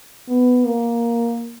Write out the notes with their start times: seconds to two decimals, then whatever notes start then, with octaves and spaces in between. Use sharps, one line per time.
0.29 B3
0.65 A#3